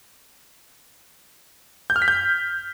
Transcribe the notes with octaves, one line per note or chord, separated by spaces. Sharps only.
G6
F6
B6
G6